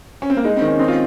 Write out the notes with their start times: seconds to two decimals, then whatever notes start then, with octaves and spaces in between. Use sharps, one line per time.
0.22 C#4
0.30 C4
0.37 A#3
0.45 G#3 D#4
0.56 C4
0.62 D#3
0.68 C#4
0.79 C4 D#4
0.88 F4